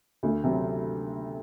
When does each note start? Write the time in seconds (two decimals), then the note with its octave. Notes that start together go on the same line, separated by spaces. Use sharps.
0.23 D2
0.44 C3 F#3